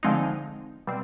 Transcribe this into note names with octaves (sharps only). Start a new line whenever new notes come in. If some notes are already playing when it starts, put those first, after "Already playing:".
D3 F3 G#3 C4 D#4
B2 G3 C4